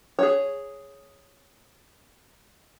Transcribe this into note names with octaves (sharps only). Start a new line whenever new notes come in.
G#4 C#5